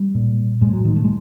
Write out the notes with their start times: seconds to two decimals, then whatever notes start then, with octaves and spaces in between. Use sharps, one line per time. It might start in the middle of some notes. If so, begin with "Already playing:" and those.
Already playing: G3
0.15 A#2
0.61 A2 G#3
0.73 F#3
0.85 D#3
0.96 A3
1.04 G#3